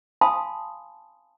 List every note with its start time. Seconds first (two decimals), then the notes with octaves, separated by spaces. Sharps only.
0.21 F5 G#5 A5 B5 C6 D#6